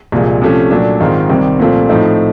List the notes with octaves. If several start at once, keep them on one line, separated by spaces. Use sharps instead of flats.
C2 A#2 F3 G#3
C3 F3 A3 C#4
A#2 F#3 A3 D4
G#2 D#3 G#3 C4 F4
C2 C3 D#3 G3 C4
A#2 F3 A3 C4 F4
A2 F3 A3 C4 D#4